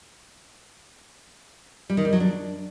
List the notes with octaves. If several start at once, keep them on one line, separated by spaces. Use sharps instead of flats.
G3
D#3
G3
F#3
D4